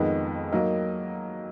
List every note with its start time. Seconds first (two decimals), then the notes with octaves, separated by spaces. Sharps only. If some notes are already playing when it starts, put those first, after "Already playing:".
Already playing: F2 D#3 G#3 B3 D#4
0.52 F#3 A#3 D#4 A#4